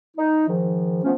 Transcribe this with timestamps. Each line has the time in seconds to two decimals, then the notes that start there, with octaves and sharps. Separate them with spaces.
0.17 D#4
0.48 G#2 D#3 F3
1.04 F3 A3 B3 C#4